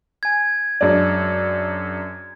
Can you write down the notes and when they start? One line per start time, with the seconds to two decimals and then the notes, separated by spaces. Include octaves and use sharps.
0.23 G#5 G#6
0.81 F#2 G#3 D4